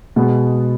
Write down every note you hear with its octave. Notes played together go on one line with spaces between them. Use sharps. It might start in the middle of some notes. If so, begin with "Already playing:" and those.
B2 G#3 B3